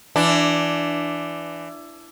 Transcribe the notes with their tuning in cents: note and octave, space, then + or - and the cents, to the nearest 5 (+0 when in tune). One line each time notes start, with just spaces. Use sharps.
E3 +20 D4 +0